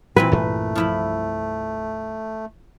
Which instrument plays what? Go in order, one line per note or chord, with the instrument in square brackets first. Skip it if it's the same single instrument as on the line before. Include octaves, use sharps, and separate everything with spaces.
[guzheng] A#2 E3 G#5 [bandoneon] C4 [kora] B4
[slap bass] C2 G2 A#3 [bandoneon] A3
[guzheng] F3 E4 B5